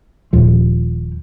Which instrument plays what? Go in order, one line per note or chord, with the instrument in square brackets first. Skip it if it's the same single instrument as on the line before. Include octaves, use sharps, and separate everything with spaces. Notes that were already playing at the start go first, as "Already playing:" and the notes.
[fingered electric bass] D#1 F3